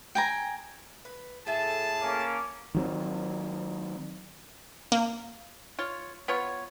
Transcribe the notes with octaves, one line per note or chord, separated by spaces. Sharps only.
G5 G#5 A#5
B4
A2 G#4 A4 E5 A5
A#3 C#4 D6
D#3 F#3 C4
A#3
F4 C#5
B3 F4 C#5